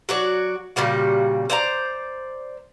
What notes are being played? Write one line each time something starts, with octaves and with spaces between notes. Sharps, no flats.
F#3 F#4 D5
A#2 C#3 G3 F#4
C5 D5 F#5 A#5